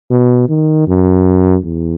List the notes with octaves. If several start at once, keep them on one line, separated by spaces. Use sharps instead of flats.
B2
D#3
F#2
E2